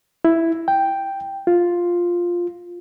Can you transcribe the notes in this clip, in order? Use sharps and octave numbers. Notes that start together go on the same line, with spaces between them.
E4
G5
F4